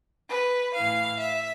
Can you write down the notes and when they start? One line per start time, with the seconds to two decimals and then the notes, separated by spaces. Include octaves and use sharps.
0.30 B4
0.75 A2 E3 F5
1.20 E5